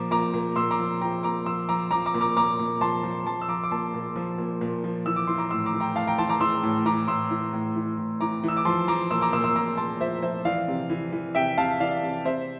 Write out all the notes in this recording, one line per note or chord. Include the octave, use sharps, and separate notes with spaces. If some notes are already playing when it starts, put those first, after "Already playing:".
Already playing: A#2 F3 A#5 D6
A#2 A#5 D6
A#2
A#2 C6 E6
A#5 D6
F3
F3 G5 A#5
A#2 A#5 D6
F3 C6 E6
F3 A#5 D6
F3 A#5 D6
A#5 D6
A#2
A#5 D6
A#2 A#5 D6
A#2
F3 A5 C6
F3
F3 A5 C6
E6
F3 A#5 D6
D6
A#2 A5 C6
A#2
F3
A#2
A#2
F3
E3 E6
D6
E3 C6
A#5 D6
A2 C6 E6
A#5 D6
E3
G5 A#5
A2 F5 A5
G5 A#5
E3 A5 C6
A#5 D6
E3 C6 E6
A2
E3 A#5 D6
A2 C6 E6
E3
A2
E3
A2
E3 A#5 D6
E3 E6
D6
F3 A5 C6
F3 A#5 D6
A#2 C6 E6
A#5 D6
A#2 C6 E6
C6 E6
A#2 A#5 D6
A#2 A5 C6
F3 C5 E5
F3 C5 E5
E3 D5 F5
C3
E3
E3
C3 E5 G5
C3 F5 A5
E3 D5 F5
C3
C3 C5 E5